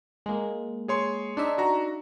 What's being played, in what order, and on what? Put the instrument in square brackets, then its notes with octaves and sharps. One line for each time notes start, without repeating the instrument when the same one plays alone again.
[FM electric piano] G#3 A#3
[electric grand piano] G#4 C#5 C6
[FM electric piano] D4 D#4 E5
[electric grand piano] F#4 A#5